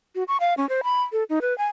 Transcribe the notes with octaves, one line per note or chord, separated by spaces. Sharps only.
F#4
C#6
F5
C#4
C5
B5
A4
D#4
B4
G#5